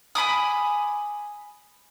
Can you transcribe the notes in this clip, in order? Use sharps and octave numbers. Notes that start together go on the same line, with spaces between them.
G#5 B5 D6 D#6